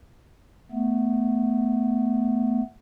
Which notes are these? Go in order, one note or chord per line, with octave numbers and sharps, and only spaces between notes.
A3 B3